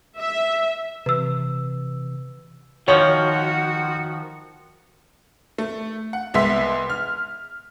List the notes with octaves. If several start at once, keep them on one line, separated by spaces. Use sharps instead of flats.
E5
C3 E3 B4 E6
D#3 F3 F#4 C#5
A3
F#5
C2 G#3 B3 E5 C6 B6
F6